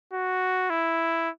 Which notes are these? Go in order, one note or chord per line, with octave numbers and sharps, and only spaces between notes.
F#4
E4